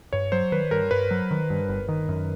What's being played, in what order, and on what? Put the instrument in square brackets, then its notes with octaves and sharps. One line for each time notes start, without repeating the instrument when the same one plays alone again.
[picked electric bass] G2 [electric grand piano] C#5
[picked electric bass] F#3 [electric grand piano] C5
[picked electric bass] D#3 [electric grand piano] B4
[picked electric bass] G2 [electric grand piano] A#4
[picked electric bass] G2 [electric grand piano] B4
[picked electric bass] F#3
D#3
G2
G1
D#3
F#2